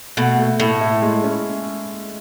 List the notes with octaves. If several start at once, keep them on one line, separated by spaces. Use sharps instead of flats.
B2 A3
A3
A2 A3
E4
G#3
C#4